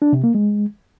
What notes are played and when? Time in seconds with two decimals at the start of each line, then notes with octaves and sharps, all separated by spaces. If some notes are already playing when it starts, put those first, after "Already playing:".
0.02 D4
0.13 C3
0.24 A#3
0.35 G#3